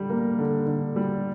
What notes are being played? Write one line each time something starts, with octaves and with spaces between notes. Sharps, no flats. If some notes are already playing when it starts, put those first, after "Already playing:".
Already playing: D3 G3
A#3
D3
D3
G3